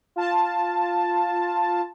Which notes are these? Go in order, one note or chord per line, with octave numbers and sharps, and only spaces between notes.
F4 A5